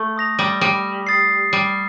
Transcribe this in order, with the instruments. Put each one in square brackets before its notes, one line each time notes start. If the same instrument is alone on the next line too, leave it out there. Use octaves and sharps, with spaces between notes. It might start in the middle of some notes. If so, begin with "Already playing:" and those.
Already playing: [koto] A3
[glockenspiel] C6 D#6 A#6 F7
[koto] G3
G3
[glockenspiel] D#6 A6 C7
[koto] G3